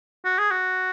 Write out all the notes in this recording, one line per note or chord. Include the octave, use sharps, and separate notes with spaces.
F#4
G#4
F#4